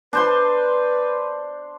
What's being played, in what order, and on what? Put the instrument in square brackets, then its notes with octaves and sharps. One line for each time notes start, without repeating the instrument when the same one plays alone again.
[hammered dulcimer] D4 C5 C6 [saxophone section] B4